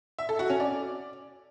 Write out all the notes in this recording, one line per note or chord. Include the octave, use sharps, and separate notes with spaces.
E5
A4
F#4
C#4
D5